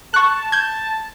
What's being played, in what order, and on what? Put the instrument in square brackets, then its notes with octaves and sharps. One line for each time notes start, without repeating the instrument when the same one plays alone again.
[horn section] A5 [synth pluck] C#6 F#6
[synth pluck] G6 G#6